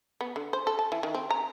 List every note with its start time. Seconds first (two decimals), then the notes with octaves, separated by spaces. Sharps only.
0.21 B3
0.36 D3
0.53 C5
0.67 A4
0.79 A5
0.92 E3
1.03 D#3
1.15 C4
1.30 A#5